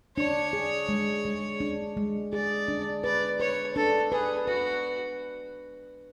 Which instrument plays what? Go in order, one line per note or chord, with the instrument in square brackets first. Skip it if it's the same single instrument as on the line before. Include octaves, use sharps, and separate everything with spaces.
[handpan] D4 [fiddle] C#5
[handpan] G#4
G#3
G#3
D4
G#3
[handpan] G#4 [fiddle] D5
[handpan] D4
[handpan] B4 [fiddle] D5
[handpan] B4 [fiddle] C#5
[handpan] D4 [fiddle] A4
[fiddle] G#4 [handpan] B4
[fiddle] F#4 [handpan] B4